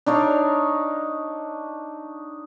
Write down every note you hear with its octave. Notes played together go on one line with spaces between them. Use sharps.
D4 D#4 C#5 F5